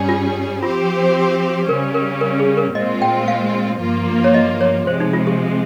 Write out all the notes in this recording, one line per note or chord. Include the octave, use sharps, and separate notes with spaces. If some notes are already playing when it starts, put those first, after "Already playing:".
Already playing: G2 G3 C#4 G#4
F4
F3 C4 F4 G4 C5
C#3 G3 C#4 A#4
A#4
A#4
G#4
A#4
A#2 G#3 C4 F4 D#5
G5
F5
G2 F3 A#3 F4
C#5
D#5
C#5
C3 F3 G#3 C5
D#4
F4
G4